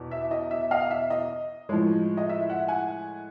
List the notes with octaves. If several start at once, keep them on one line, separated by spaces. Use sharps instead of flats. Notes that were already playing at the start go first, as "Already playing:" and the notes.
Already playing: E2 B2
E5
D#5
E5
D#5 F5
E5
D#5
A2 F3 G#3
D#5
E5
E5 F#5
F#5 G#5